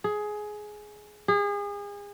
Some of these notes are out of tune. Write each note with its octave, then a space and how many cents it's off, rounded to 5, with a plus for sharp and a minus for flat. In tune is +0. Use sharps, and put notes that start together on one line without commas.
G#4 +15
G#4 -35